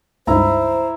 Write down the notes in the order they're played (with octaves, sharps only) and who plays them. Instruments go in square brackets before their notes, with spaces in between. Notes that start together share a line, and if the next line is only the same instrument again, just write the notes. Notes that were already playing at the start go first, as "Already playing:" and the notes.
[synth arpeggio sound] C#2 G2 D#4 [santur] E4 A#5 [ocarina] C5